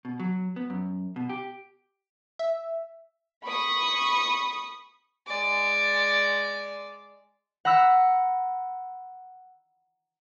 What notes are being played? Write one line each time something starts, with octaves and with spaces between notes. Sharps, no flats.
B2
F#3
B3
F#2
B2
G4
E5
B5 C#6 D#6
G#3 D5
F#5 A#5 B5 E6 F#6